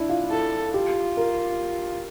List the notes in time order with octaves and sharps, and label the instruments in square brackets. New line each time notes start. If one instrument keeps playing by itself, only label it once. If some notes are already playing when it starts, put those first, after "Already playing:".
Already playing: [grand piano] D4 E4
F4
[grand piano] E4 [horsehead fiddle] A4
[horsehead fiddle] F4 [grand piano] G4
[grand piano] A#4